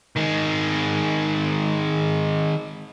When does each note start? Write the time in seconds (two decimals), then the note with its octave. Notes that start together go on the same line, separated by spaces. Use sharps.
0.16 D#3 G#3